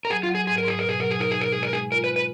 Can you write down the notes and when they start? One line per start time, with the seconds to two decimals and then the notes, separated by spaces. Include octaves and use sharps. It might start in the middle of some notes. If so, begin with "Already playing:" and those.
0.05 A#4
0.10 F#3 G#4
0.23 F4
0.29 F#3
0.35 G#4
0.47 G#2 G#4
0.58 A#4
0.65 G#2 G#4
0.79 B2 A#4
0.89 G#4
1.00 F#3 A#4
1.11 G#4
1.19 D#4 A#4
1.31 G#4
1.37 B2 A#4
1.52 G#3 G#4
1.63 A#4
1.73 G#3 G#4
1.92 F4 A#4
2.04 B4
2.10 G#3
2.16 B4